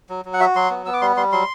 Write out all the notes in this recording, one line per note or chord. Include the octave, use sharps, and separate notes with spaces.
F#3
F#3
F#5
F#4 E5
F#3 C6
B3
B3 E6
D6
G3 C6
G3 C6
F#3 C6